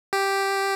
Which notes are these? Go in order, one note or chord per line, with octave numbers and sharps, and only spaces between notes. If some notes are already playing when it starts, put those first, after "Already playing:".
G4